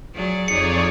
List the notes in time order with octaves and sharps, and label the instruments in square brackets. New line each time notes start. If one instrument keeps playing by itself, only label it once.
[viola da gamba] F#3 G#4 D5
[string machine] F2 C#5 D5 [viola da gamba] D#4 G#4 [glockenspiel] C#7